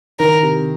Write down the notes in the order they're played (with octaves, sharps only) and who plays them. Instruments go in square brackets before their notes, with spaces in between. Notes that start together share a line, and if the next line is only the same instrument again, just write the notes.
[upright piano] D#3 [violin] A#4
[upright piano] C3